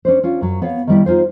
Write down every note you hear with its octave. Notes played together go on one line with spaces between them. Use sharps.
C#4 D4 C5
C#4 D4 F4
F#2 F#3
B3 C#5 F5
D#3 G3 E4
D#4 F4 G#4 C5